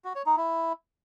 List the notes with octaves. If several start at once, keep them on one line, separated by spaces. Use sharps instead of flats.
F#4
C#5
D#4
E4